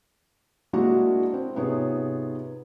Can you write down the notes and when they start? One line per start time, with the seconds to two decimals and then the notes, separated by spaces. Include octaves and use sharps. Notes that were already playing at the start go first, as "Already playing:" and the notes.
0.73 G#3 A#3 D4 E4 F#4 G#4
1.33 C4
1.55 G#2 C3 B3 F4 G#4 C#5